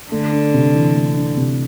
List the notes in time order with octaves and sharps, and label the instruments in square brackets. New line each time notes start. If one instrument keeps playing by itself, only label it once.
[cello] D3 [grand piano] A3
[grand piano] D4
C3
E3
A3
D4
C3